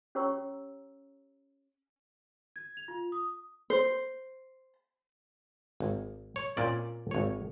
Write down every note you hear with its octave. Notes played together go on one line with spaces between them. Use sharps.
C#4 G4 C#5 A#5 C#6 E6
G#6
F7
F4
D#6
C5
G#1
C#5
A#2 C4 C#4 D5
G#1 C#5